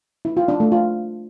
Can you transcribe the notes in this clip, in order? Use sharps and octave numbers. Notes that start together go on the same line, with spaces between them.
E4
F4
D4
A3
F4